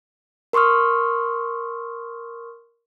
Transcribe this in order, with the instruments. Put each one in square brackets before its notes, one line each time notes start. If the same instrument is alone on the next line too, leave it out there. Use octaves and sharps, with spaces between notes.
[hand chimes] A#4 C6 C#6 D#6 F6